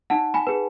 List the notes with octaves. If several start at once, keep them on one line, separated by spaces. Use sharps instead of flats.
D#4 F#5 A5
G#5 B5
G#4 B4